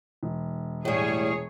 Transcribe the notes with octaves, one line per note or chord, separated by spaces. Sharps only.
E1
A2 G3 G#4 C#5